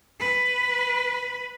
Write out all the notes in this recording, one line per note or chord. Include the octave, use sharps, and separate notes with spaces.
B4